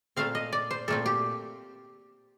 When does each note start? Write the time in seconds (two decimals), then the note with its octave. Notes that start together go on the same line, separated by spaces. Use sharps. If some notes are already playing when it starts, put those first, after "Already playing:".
0.16 A#2 A3 C4 F5
0.35 D#5
0.53 D5
0.71 C5
0.88 A#2 A3 C4 A4
1.06 G4